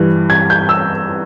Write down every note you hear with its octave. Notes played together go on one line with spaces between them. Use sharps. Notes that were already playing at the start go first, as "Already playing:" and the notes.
Already playing: G2 E3
G#6
G6
E6